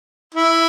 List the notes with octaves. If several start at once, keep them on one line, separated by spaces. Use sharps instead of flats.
E4